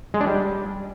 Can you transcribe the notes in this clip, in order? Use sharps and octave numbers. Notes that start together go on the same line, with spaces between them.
G#3
D4
G3